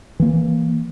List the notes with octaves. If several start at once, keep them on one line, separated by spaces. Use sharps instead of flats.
E3 A#3